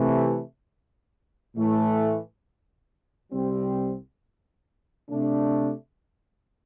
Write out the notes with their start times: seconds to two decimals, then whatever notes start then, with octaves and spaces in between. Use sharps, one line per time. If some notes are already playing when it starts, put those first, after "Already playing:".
Already playing: C3 E3 A3
1.55 A2 E3 A3
3.32 C2 C3 G3 C4
5.10 C3 A3 D4